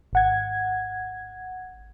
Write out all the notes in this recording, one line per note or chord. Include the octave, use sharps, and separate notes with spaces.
G#1 F#5 G#6